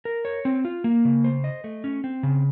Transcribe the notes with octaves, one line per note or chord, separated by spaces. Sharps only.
A#4
C#5
C4
F4
A#3
C#3
C5
D#5
A3
C#4
C4
C#3